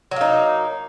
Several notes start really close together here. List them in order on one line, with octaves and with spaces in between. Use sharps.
F#3 A#3 D#4